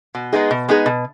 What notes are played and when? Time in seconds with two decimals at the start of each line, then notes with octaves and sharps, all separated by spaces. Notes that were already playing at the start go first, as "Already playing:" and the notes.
0.15 B2
0.33 G#3 B3 D#4 G#4
0.51 B2
0.68 G#3 B3 D#4 G#4
0.86 B2